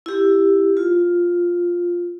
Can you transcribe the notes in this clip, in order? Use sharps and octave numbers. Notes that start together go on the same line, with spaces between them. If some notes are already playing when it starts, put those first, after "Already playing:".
E4 G4
F4